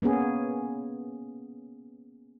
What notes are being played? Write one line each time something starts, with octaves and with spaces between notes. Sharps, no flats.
A#3 B3 C#4 G#4